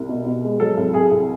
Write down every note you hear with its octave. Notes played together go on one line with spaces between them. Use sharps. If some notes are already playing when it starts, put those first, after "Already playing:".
Already playing: C2
B2
B2
G#3
F#3 A4
C2
C2 G#4
C2